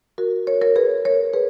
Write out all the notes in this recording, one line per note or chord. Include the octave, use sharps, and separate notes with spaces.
F#4 A#4
A#4 C#5
A#4 C#5
G#4 B4
A#4 C#5
G#4 B4